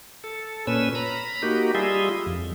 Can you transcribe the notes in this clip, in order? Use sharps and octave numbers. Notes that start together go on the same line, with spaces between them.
A4
A#2 C#4 B4 E6
A#5 B5
A#3 D#4 F#4 G4
G3 F4 G#4 D#5 E5
F2